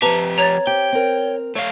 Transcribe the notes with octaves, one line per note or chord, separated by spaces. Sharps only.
F3 C4 G4 B4 E5 A5 A#5
C#5 A#5 A6
C4 G4 G5
C4 A#4
A3 C#5 F5 G5